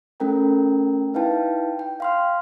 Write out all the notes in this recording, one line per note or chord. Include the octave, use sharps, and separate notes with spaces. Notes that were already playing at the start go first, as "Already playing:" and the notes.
A3 C#4 A4 A#4 G5 A#5
D#4 E4 B4 F5 G5 A5
G5
F5 C6 F6